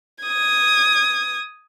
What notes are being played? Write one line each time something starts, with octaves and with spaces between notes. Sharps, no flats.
D#6 G#6